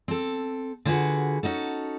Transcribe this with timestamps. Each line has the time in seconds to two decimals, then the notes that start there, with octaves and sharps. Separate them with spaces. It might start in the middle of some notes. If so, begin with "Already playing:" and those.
0.08 C4 A4
0.85 D3 F4 F#4 G#4 B4
1.43 C#4 D#4 F#4 A4